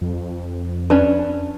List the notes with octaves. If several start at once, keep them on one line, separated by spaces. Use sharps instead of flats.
F2
C#4 D4 B4